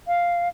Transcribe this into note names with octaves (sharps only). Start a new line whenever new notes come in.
F5